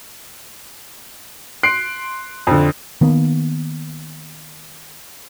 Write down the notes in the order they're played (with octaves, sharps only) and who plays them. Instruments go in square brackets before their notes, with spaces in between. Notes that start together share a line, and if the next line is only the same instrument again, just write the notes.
[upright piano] C6 F#6 C7 D7
F2 D3
[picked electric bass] D#3 A#3 B3